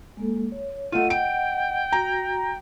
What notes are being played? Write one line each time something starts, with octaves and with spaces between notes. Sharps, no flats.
G#3 A#3 A4
C#5
A3 F4 D#5 F#5 D#7
G5 D7
F#4 A#5